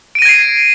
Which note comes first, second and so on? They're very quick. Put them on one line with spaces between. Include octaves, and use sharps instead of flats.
D7 D#7 A#6 G#6 C7